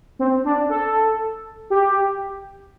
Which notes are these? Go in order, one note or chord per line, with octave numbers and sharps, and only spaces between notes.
C4
D4
A4
G4